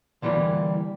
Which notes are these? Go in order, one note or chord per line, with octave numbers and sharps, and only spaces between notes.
D3 E3 G3 G#3 A#3